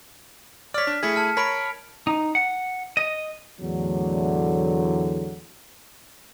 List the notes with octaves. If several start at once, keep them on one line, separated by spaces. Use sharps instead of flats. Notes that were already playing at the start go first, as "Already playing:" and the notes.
C#5 D5 F6 B6
D4
A3 E4 G#4 G#6 B6 C#7
A5 F6
A#4 C#5 B5 B6 D7
D#4
F#5
D#5
E2 A2 D3 F#3